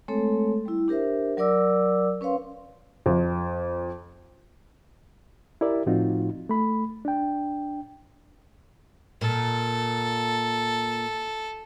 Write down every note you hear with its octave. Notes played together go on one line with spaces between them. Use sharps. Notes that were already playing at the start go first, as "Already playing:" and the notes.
G#3 A3 C4 A4 C#5
G3 E4
D4 G4 A#4 C5 E5
F#3 A#4 D5 D6 E6
C#4 B4 C#5 F5 C6
F2
E4 G4 A#4 D5 E5
A2 F3 C4 D#4 F4 F#4
A3 B5
D4 G5
A#2 A4